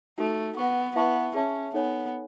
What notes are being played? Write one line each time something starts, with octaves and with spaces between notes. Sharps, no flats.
A3 D#4 F#4 A4
B3 B4 F#5 C#6
B3 E4 B4 E5 A5 C#6
C#4 G#4 C#5 E5 A5
B3 D#4 A4 C#5 G#5